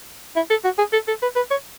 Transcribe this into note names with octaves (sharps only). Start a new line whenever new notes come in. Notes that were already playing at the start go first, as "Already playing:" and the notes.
E4
A4
F#4
G#4
A4
A4
B4
B4
C#5